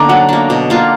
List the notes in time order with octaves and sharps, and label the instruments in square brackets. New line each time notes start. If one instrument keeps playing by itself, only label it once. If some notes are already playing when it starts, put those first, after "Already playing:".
Already playing: [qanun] D3 A#3 D4 [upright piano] A#5 D6
[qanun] F#3 [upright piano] F#5
[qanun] A#3 D4
B2
A#3 D4 F4